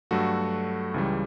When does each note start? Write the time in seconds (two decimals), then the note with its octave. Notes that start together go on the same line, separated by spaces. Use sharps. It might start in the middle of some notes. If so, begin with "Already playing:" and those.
0.11 G2 F#3 A3 F#4 A4
0.94 C#2 C#3 E3 G3